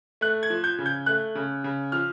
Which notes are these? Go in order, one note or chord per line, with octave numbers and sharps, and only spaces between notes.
A3 F#6
G#6
F3
G6
C#3
G6
A3 F#6
C#3
C#3
F3 F6